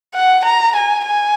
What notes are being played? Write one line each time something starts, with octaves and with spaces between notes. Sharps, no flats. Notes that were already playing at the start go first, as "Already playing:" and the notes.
F#5
A#5
G#5
G#5